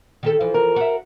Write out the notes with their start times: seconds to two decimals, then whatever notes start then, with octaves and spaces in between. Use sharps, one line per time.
0.23 D#3 G4 A4
0.40 E3 F3
0.54 A#4
0.76 F#4 E5